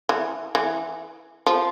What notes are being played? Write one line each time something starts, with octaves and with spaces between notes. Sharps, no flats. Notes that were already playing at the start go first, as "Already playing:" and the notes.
E3
E3
F3